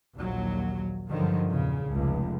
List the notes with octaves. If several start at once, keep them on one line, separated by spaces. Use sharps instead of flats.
A#1 D#2 A#2 F#3
G2 D3 D#3 F3 F#3
E2 A#2 C#3
F1 C#2